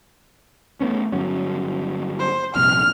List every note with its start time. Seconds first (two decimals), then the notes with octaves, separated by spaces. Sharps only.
0.81 A3 B3 C#4
1.12 G1 F#3 C#4
2.19 C5
2.55 A#1 G2 C3 F6